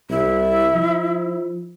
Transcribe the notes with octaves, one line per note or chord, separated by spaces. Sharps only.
C2 E4
F3